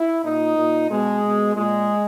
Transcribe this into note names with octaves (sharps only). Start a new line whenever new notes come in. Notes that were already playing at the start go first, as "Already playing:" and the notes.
Already playing: E4
A#2 D#4
A#2
B2 G#3
B2
A#2 G#3